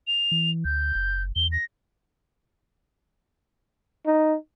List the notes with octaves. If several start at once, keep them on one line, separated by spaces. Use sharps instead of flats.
F7
E3
D2 G6
F#1
E2 G7
A#6
D#4